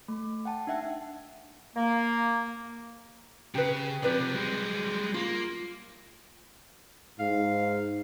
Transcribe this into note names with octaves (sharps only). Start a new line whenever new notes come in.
A3
F#5 G5 A5
D4 D#4 E5 F#5 G5
A#3
C#3 G4 B4
C3 F3 G4 B4 D5
G3 G#3
A#3 F4
G#2 F5